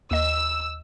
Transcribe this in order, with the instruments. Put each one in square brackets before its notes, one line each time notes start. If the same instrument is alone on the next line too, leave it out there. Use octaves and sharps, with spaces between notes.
[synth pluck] D#2 D#5 [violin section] E6